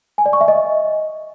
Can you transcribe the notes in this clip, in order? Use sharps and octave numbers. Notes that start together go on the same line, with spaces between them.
G#5
D5
C#6
E5
D#5